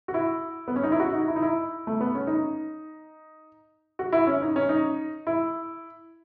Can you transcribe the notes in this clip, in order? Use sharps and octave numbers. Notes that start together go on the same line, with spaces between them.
F#4
E4
B3
C#4
D#4
E4
F#4
D#4
E4
D#4
E4
A3
B3
C#4
D#4
F#4
E4
C#4
D#4
C#4
D#4
E4